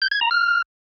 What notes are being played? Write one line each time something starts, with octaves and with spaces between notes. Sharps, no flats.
G6
G#6
A#5
F6